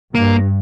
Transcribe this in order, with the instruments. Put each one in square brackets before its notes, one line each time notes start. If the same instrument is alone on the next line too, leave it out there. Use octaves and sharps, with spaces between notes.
[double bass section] G2 [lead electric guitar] A#3